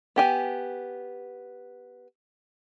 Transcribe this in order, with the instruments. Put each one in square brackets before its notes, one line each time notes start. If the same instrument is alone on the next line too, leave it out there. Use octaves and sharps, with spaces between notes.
[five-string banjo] B3 G4 G#5